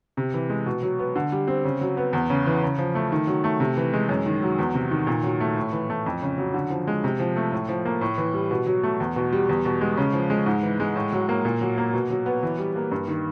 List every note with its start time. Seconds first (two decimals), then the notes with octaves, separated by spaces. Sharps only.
0.17 C3
0.34 E3
0.50 G#3
0.66 B2
0.83 F#3
0.99 B3
1.16 D3
1.32 G3
1.47 C4
1.65 C#3
1.81 F#3
1.97 B3
2.13 E2
2.30 C#3
2.47 E3
2.62 C#3
2.79 F3
2.95 A3
3.12 D#3
3.27 F#3
3.44 A3
3.60 C3
3.77 E3
3.93 G#3
4.09 F#2
4.26 D#3
4.42 F#3
4.59 E2
4.75 C3
4.91 D#3
5.07 A#2
5.24 F#3
5.40 A3
5.57 A2
5.73 E3
5.90 A3
6.06 F2
6.22 C#3
6.38 F#3
6.54 D3
6.70 F3
6.88 G#3
7.04 C3
7.20 F3
7.36 A3
7.52 A2
7.69 F3
7.85 A#3
8.01 A2
8.18 E3
8.34 G3
8.51 B2
8.67 F#3
8.83 A3
9.00 E2
9.16 B2
9.33 G3
9.49 E2
9.65 B2
9.81 G#3
9.97 C#3
10.13 F3
10.30 G#3
10.46 G#2
10.63 E3
10.80 G#3
10.96 A2
11.12 F#3
11.29 A#3
11.45 A#2
11.61 F#3
11.78 A#3
11.93 B2
12.10 F#3
12.26 B3
12.43 E3
12.58 G3
12.76 A#3
12.91 G2
13.08 D#3